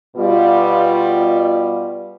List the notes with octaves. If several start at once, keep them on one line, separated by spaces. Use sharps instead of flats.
B2 G3 F4